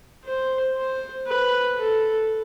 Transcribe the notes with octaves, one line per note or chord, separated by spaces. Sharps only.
C5
C5
B4
A4